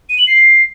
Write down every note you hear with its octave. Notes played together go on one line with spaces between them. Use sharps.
D#7
F#7
C7